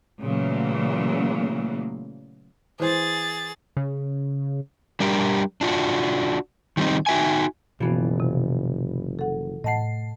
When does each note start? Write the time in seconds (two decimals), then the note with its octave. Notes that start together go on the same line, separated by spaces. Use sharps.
0.21 A#2 C#3 E3 F#3 A3 A#3
2.80 E3 G#4 C5 A6
3.77 C#3
5.00 G3 D4 G4 A#4
5.61 D4 F4 F#4
6.77 D#3 F#3 G3 C4 D#4
7.06 D#4 F#4 E5 G5 G#5
7.80 F#1 B1 B2 E3 F3 B3 F#4
8.20 C3
9.19 A4 F#5
9.64 A2 D#5 F#5 A5 C7